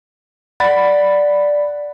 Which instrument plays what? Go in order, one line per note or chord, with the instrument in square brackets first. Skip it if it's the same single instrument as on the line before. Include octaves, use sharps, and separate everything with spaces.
[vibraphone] D5 [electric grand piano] F#5 B5 A6